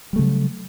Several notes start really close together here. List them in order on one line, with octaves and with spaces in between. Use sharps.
G3 A3 C#3 F#3